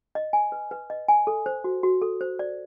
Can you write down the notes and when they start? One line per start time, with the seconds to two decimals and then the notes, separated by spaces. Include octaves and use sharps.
0.15 D#5
0.33 G#5
0.52 B4
0.71 B4
0.90 D#5
1.08 G#5
1.27 A4
1.46 C5
1.64 F#4
1.83 F#4
2.02 A4
2.21 C5
2.39 D5